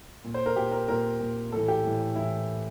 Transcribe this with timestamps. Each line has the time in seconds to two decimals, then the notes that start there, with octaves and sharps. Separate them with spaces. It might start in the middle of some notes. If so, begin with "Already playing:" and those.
0.24 A#2
0.34 C5
0.46 A#4
0.56 A#2 G4
0.72 A#4
0.88 A#2 A#4
1.20 A#2
1.51 A2 E3 A4
1.68 G4
1.84 A2 E3
2.16 A2 E3 E4